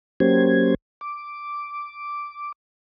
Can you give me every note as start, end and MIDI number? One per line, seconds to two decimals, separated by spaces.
0.20 0.75 54
0.20 0.75 58
0.20 0.75 61
0.20 0.75 67
0.20 0.75 72
0.20 0.75 92
1.01 2.52 86